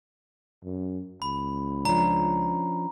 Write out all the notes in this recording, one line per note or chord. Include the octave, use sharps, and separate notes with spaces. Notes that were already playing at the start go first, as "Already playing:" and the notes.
F#2
C#2 B5
F3 C#4 D4 A#5